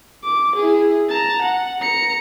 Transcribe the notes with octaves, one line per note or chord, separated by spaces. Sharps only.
D6
E4 G#4
A5 A#5
F#5
A#5 C#7